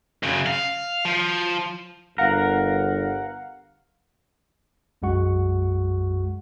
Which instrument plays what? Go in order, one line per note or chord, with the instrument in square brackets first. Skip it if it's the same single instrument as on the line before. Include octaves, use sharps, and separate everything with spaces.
[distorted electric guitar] F#2 C#3
F5
F3
[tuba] G1 [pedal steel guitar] A#4 [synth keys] F5 F#5
[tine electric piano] B1 F#2 G#3 F#4 F#5 C#6